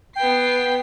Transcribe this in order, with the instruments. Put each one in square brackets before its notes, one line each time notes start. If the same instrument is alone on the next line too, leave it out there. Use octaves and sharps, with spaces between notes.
[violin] B3 C7 [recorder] G5